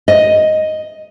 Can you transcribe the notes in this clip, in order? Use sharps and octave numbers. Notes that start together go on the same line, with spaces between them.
D#5